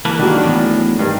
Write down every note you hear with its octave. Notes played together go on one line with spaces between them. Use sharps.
E3 A#3 B4 A5
D#3 F#3 D4
E2 A2
G2 D#3